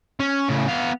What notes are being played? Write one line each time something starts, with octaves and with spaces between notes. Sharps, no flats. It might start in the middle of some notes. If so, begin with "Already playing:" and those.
C#4
A2 C#3
B3 F5